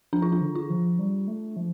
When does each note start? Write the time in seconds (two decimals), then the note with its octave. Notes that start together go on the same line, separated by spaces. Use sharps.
0.13 F3 D4
0.22 F4
0.32 D4
0.41 D3
0.55 F4
0.70 F3
0.99 G3
1.28 A3
1.56 F3